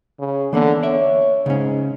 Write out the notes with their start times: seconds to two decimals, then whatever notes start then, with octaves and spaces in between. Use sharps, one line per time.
0.20 C#3
0.53 D3 E3 A#3 B3
0.83 C#5 D5 E5
1.46 G#2 C#3 C#4